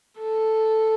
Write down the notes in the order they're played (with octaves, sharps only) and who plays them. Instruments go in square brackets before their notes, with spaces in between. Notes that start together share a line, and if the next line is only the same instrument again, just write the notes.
[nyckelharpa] A4